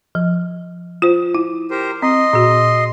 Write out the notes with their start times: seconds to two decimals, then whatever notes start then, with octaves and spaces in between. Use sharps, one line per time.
0.15 F3
1.02 F4 C5
1.35 E4
1.71 G4 A#4 C5
2.02 C4 D#5 C6
2.33 A#2 F#4